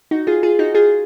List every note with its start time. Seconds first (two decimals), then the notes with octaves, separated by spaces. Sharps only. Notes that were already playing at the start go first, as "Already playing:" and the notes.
0.11 D#4 F#4
0.27 F4 G#4
0.43 F4 G#4
0.59 D#4 F#4
0.74 F4 G#4